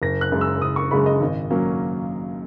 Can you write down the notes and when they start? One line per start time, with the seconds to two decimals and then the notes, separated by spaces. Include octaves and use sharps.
0.02 F#1 A#6
0.21 F#6
0.32 F#2 C#3 G#3
0.41 E6
0.62 F#1 D#6
0.76 C#6
0.91 F#2 C#3 G#3 B5
1.06 D#5
1.21 G#1
1.50 F#3 A#3 C#4